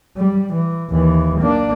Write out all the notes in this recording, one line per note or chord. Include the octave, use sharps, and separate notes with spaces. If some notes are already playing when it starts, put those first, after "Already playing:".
G3
E3
D#2 E3
A#3 D4